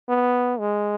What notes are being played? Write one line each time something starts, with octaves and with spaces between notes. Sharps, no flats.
B3
G#3